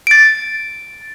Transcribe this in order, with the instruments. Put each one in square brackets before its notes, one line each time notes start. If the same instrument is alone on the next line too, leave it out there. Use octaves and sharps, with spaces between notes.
[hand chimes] A6 D7